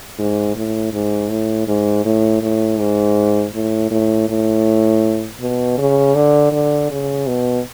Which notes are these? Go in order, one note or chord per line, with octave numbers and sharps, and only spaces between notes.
G#2
A2
G#2
A2
G#2
A2
A2
G#2
A2
A2
A2
B2
C#3
D3
D3
C#3
B2